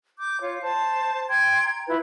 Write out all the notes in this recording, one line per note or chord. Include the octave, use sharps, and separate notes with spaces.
D6 G6
F4 C#5
C5 A5
G5 C6 G#6
A#5
E4 F4 B4